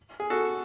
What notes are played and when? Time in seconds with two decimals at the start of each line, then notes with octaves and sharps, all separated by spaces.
0.20 G#4
0.30 F#4 A4